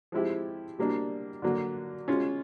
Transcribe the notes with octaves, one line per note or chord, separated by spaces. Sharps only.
F3 G#3 C4 E4 G4
B2 G3 A#3 D4
D3 F#3 A#3
B2 G#3 C#4 F4